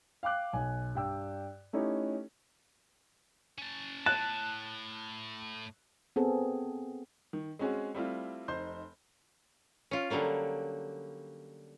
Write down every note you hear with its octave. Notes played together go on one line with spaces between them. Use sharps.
F5 G5 D6 F#6
B1 G#5
G2 D5 G5 E6
A3 C#4 D#4 E4 G4 A4
C#4 A5
A2 A5 F#6
B3 C4 G#4 A4
D#3
G#3 C4 C#4 F#4 G#4
G3 A3 C4 E4 F4
F1 D#4 C5 C6 G6
C#4 F4
D3 F#3 G3 A#3 C#4